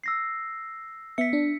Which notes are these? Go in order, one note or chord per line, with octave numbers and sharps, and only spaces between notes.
E6 A#6 C7
B3 E5 B6 C#7
D4